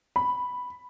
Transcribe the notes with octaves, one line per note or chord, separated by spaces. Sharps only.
B5